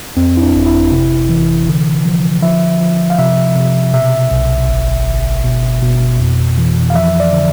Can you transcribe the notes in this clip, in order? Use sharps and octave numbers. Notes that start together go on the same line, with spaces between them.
F2 C4
E4
D4
G1
E4
C3
E3
D3
F3
F3 E5
F3
F5
C3 E5
C3
B2 E5
B1
G1
G1
B2
B2
F2
E3
F5
F3 E5
D5
D3